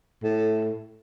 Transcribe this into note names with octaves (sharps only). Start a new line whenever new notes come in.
A2